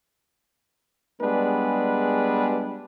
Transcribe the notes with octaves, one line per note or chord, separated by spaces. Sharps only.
G3 G#3 B3 D4 G#4 B4